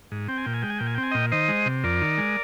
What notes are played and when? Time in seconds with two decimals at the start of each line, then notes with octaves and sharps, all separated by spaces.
0.11 G#2
0.28 C4 G5
0.37 G#5
0.45 A#2 G5
0.54 G#5
0.62 G#3 G5
0.70 G#5
0.78 A#2 G5
0.87 G#5
0.95 C4 G5
1.03 G#5
1.11 A#2 D#5 G5
1.32 D#3 C5 D#5
1.48 G#3
1.66 C3
1.84 F2 A#4 D5
2.01 D#3
2.18 G#3